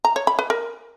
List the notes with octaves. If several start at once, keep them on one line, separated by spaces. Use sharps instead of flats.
A#5
C#5
B5
B4
A#4